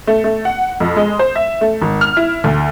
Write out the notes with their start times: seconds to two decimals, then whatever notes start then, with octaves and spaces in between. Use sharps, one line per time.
0.07 A3
0.24 A3
0.45 F#5
0.80 F2
0.96 G#3
1.19 C5
1.35 E5
1.61 A3
1.82 G#1
2.01 F6
2.17 E4
2.44 D2